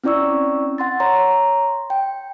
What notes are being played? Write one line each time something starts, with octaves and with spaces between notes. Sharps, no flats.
C4 C#4 E4 D5 C#6 E6
F#5 C6 A6
C#5 A#5 C6
G5